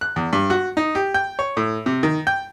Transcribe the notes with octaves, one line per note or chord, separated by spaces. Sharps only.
F#6
E2
G2
F#4
D#4
G4
G5
C#5
A2
C3
D#3
G5